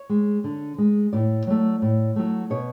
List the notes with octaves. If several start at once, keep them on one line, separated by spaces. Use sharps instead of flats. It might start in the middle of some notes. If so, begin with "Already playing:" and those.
Already playing: C#5
G#3
D3
G#3
A2 D5
F#3 A3
A2
F#3 A3
B2 C#5